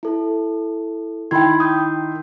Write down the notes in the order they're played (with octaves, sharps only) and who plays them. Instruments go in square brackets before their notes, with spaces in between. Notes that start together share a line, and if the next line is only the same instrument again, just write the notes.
[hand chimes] E4 A4
[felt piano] D#3 E4 C6 [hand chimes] G5 B5 G#6
[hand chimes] D#6 G6